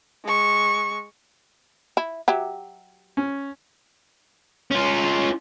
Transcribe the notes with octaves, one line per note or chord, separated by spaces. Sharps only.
G#3 C#6
E4
F#3 G4 E5
C#4
C#4 F4